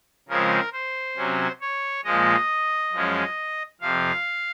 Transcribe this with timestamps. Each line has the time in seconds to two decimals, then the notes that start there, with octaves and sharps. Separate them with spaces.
0.28 C#3 F3 G#3 C4 A#4
0.73 C5
1.17 C3 F#3 C#4
1.61 C#5
2.05 A#2 F3 G#3 D#5
2.92 F#2 F3 G#3 C#4
3.81 F2 C3 F3 F5